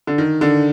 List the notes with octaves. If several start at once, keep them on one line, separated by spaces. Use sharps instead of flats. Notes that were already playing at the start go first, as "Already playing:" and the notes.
D3
D#3
D3